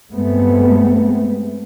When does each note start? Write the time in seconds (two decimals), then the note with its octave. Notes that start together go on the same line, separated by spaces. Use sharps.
0.10 G2 G#3 A3 B3 C4